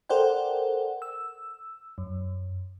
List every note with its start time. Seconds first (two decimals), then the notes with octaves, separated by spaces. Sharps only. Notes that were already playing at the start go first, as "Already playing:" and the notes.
0.09 A4 A#4 C5 D5 F#5 G5
1.02 E6
1.98 F#2